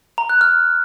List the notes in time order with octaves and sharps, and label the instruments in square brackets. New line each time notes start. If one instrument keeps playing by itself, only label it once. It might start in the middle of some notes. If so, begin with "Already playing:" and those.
[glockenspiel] A#5
F#6
F6